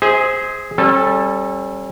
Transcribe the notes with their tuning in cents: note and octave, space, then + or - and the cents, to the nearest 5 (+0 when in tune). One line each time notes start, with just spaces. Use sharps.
G#4 +0 C5 +0 E5 -45
G3 +0 C#4 -35 A4 +0